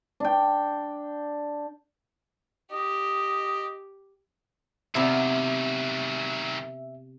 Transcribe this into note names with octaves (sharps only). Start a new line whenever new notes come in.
D4 G5
G4 D#5
C3 D#3 F#3 B3 E4 E5